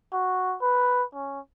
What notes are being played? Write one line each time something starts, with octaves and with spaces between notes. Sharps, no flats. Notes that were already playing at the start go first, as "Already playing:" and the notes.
F#4
B4
C#4